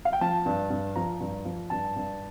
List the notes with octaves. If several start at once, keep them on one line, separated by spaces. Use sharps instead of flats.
F5
G5
F3 A5
G2
G2
F3 A#5
G2
F3
G2 A5
G2